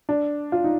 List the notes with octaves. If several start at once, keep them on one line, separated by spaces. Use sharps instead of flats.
D4
F4
D#4